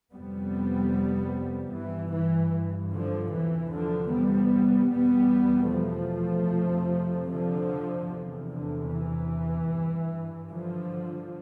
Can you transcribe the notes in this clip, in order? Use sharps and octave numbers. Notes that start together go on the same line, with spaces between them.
F2 C3 G3 B3
G2 E3
E3
D3 F3
E2 C3 E3
D3 F3
G3 B3
E2 B2 G3 B3
F3 A3
F2 C3
D3 F3
E2 C3
D3
E3
G2
D3 F3